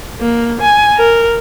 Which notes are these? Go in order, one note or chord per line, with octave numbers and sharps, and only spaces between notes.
A#3
G#5
A#4